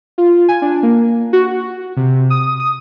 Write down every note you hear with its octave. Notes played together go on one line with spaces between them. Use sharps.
F4
G#5
D4
A#3
F#4
C3
D#6
D#6